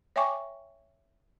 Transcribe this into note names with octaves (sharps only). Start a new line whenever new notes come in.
C#5 E5 G5 G#5 C#6 D6